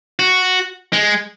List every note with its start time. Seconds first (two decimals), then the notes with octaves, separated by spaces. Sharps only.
0.19 F#4
0.93 G#3